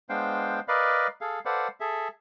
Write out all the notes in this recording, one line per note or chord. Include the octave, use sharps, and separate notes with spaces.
G#3 B3 D4 C5 F5 G5
A#4 B4 D5 D#5 F5 B5
G#4 A4 F5
A4 B4 C5 D5 F5 F#5
G#4 A4 E5